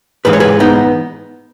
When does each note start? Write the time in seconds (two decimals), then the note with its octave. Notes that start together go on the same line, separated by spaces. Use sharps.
0.25 G#2 E3 G#3 B4
0.33 C#5
0.40 G#4 B4
0.60 B3 D#4